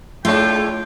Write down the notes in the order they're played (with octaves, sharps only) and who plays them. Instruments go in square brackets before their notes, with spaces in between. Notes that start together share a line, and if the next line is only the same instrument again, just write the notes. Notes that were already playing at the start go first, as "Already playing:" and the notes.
[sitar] G#3 D4 E4 [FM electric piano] A3 C#5 [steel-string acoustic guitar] F4 [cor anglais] G5